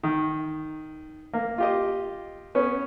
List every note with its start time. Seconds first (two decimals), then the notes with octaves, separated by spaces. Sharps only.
0.03 D#3
1.34 A#3
1.58 F4 G4 D#5
2.55 B3 C#4 C#5